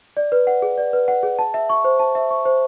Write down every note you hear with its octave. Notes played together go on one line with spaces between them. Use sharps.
D5
B4
F#5
G#4
D5
B4
F#5
G#4
A5
E5
C#6
C5
A5
E5
C#6
C5